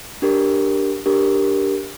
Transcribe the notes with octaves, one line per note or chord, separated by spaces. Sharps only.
D4 G4 A#4
D4 G4 A#4